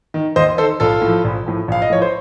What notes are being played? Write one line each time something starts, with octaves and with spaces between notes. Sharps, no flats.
D#3
D#2 C5 D#5
D#3 A4 C5
A#1 F4 A4
A2
F3
A#1
A2 F3
A#1 F5
D#5
A2 F3 C#5
C5